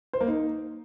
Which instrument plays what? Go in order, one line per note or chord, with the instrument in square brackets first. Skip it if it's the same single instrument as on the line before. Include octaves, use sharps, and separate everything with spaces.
[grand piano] C5
A#3
D#4